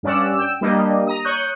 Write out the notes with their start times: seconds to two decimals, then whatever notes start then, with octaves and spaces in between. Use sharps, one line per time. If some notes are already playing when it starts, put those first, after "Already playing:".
0.03 G2 C#4 D5 F#5 E6
0.35 G5 E6
0.61 G3 A#3 D4 D#5
1.07 A#5 D#6
1.25 C#5 C#6 D#6 F#6 G6